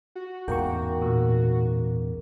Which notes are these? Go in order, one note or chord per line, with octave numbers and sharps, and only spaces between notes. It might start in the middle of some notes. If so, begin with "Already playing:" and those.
F#4
A1 E2 G#2 A#3 A#4 G5 C#6
A#2